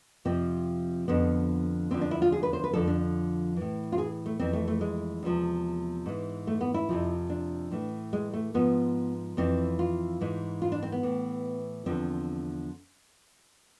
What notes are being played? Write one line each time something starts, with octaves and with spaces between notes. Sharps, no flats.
F2 C3 F3 C4
F2 D3 F3 B3
E2 D3 F3 C4
D4
E4
F4
G#4
B4
C5
B4
F2 D3 F3 A4
D4
A2 E3
F4
G#4
A3
F2 E3 C4
A3
A3
G#3
E2 C3 F3
G#2 E3
A3
B3
E4
F2 C3 F3
D4
A2 E3
G#3
A3
G#2 F3 B3
F2 E3 C4
F4
G#2 E3
F4
D4
C4
B3
A2 E3
E2 D3 F3 C4